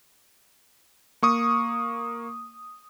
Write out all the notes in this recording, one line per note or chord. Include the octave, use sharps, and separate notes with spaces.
A#3 C#6 D#6